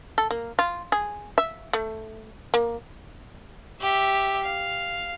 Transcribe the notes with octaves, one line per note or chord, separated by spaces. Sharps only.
A4
A#3
F4
G#4
E5
A3
A#3
G4 E5
F5